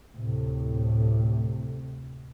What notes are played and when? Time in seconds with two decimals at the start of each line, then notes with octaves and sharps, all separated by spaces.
0.13 D2 A2 C3